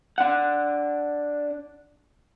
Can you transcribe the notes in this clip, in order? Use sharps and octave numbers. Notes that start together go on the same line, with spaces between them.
D4 F#5